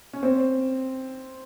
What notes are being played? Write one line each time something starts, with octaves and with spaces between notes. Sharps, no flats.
C#4
C4